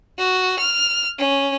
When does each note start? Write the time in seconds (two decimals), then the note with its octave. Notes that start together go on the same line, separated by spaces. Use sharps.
0.18 F#4
0.59 F6
1.18 C#4